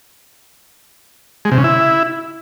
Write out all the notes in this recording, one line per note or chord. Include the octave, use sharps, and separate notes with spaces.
G#3
C3
C#3
E4